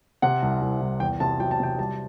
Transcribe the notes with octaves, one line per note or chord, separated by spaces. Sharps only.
C3 F#5
C2
C2
C2
E2 G5
C3 A5
F#3 G5
A5
C3 G5
G3 A5